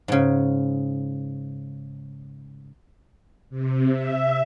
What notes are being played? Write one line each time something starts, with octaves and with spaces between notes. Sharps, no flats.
G#2 C#3
C3
E5